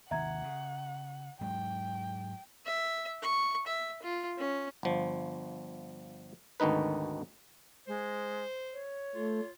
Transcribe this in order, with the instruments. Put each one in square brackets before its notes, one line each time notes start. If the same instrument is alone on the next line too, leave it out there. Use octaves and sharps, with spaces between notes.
[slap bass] D#2 C3 D#3 [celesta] E5 A#5 G#6 [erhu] F#5
[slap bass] C#3
[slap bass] G#2 F#3 G#3 [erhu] G5
[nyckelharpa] E5
C#6
E5
F4
C#4
[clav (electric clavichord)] G1 F3
G#1 D2 D#3 D#4 B4
[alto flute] G#3 [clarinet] C5
[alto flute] C#5
[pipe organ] A3 [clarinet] F4